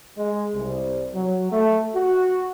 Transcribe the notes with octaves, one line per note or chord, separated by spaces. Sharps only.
G#3
C2
F#3
A3
F#4